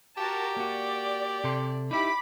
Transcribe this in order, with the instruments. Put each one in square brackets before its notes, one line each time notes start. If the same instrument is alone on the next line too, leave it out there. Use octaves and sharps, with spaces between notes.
[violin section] F#4 A#4 A5 [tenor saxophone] G4
[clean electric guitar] A#3 F#4 [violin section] D5
[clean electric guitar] C3 A4 C6
[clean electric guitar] D#4 E4 G4 [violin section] B5 D6